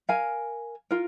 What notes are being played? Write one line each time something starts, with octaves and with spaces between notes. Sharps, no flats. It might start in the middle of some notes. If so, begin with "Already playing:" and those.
A#4 F5 G#5
F4 A#4